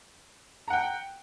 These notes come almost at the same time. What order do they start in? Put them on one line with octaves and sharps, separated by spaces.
A#5 F#5 G5